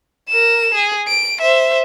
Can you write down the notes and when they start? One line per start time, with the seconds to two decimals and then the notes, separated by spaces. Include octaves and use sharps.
0.29 A#4 E7
0.75 G#4
1.08 D7
1.42 C5 E5